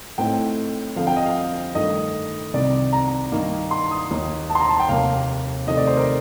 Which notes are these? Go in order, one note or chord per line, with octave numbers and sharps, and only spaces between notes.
A2 A3 C4 D#4 G5
F2 D3 F3 F5
G5
D#5
F5
G2 D#3 A3 D#5
C2 C3 D#3 D5
A#5
G2 D#3 A#3 D#4
C6
D#6
D#2 D#3 A#3 D#4
A5
C6
A#5
A5
G5
F1 D#2 D#3 A#3 F5
F1 F2 D#3 A3 C4 D#5
D5
C5
A#4